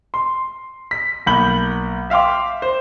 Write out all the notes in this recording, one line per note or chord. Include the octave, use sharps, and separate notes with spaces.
C6
B6
B1 A#3 F#5 B5 G6 F#7
E5 F5 G5 C6 D6
C5